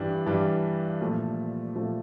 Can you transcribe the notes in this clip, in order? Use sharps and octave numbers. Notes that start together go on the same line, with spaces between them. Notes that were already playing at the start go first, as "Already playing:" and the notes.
Already playing: G2 E3 G3 D4
G2 E3 G3 D4
A#2 F3 A3
A#2 F3 A3